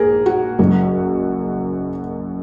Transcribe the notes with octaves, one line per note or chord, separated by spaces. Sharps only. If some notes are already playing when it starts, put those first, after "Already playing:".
Already playing: A#1 G#2 G#4 A#4
F#4
F#1 F#2 F#3